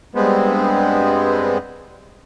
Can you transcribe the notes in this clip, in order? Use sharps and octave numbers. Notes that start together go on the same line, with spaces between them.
G2 G#3 B3 C4